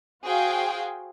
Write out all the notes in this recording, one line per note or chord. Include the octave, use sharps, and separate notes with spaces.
F#4 G#4 C5 F5 G5